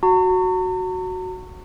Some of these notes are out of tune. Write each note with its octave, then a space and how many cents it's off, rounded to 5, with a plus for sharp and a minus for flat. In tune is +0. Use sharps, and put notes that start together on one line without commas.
F#4 +0 A#5 -45